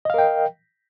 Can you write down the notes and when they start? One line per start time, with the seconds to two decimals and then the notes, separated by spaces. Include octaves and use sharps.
0.05 D#5
0.10 F5
0.14 A#4
0.18 G5